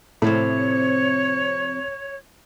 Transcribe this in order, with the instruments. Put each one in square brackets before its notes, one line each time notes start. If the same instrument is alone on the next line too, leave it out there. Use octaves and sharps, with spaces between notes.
[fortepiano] A2 [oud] C3 F3 C4 [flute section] C#5